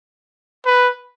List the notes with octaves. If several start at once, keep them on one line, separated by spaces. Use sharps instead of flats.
B4